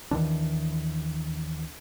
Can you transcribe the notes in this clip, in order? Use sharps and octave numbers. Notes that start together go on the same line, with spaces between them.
D#2 D#3 E3 D4